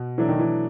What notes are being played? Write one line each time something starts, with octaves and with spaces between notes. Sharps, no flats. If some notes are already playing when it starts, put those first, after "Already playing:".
Already playing: B2
E3 F#3 A3 D4
D#3
E3